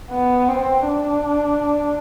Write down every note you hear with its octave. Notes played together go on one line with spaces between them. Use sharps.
B3
C4
D4